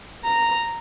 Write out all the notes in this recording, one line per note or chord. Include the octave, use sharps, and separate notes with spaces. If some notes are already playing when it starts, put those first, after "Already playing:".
A#5